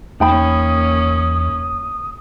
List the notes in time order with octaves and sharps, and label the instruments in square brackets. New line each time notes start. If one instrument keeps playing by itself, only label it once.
[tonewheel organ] E2 [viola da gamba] A#3 C#4 [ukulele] D#4 G5 B5 [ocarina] D#6